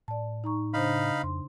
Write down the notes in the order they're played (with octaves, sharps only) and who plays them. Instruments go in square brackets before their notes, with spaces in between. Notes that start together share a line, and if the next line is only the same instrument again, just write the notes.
[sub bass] A2 [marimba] D5 A5
[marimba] D#4 A#5 C#6
[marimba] C#3 D4 C5 [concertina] D#4 F5 B5
[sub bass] F2 [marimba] C6